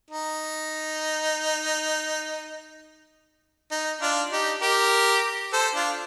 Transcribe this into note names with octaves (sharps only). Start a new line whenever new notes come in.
D#4
D#4
D4 F4
D#4 G4
G4 A#4
A4 C5
D4 F4